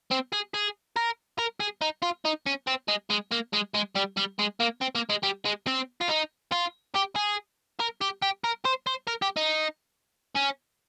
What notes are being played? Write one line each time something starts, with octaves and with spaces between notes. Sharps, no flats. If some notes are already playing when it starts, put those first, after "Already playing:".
C4
G#4
G#4
A#4
A#4
G#4
D#4
F4
D#4
C#4
C4
G#3
G#3
A#3
G#3
G#3
G3
G3
G#3
A#3
C4
A#3
G#3
G3
G#3
C4
F4
D#4
F4
G4
G#4
A#4
G4
G4
A#4
C5
C5
A#4
G4
D#4
C#4